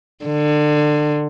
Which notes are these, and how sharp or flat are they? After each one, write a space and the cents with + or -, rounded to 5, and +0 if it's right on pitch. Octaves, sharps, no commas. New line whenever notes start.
D3 +25